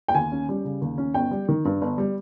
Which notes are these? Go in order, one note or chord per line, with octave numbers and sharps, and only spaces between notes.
G5
D#2 G#5
C#4
G3
C#3
D#2
C#4
G1 G5
G3
D#3
G2
G1
G3